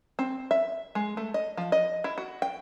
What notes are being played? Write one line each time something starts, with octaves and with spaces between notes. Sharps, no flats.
C4
E5
G#3
A3
D#5
F3
D#5
E4
F#4
G5